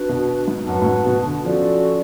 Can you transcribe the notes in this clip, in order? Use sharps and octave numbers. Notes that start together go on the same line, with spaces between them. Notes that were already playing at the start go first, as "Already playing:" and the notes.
Already playing: D4 F#4 B4
B2
G#2
F#2 F#4 B4 F#5 A5
A2
G#2
B2
D3
F3 C#4 F#4 A4 D5